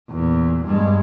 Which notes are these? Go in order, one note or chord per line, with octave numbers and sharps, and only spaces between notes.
E2 A#2
G2 G#3